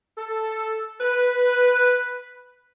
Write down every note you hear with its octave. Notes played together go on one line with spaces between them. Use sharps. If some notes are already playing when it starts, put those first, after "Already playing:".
A4
B4